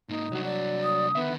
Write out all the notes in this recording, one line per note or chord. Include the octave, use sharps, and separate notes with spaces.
G#2 A#3 D#4
C2 F#3 D4 F#4
D5
D#6
D3 D#3 B3 E5